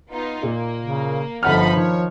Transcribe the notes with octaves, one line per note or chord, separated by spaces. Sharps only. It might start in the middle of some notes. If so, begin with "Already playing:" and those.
B3 D#4 F4
A#2 A#3
C#3
G1 F3 D#4 A4 F#5 B5 F6
D#3 C#5